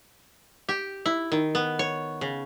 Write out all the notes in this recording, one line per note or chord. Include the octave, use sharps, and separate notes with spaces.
G4
E4
D#3
B3
C#5
C#3